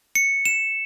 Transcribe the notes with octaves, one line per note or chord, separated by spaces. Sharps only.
C#7
E7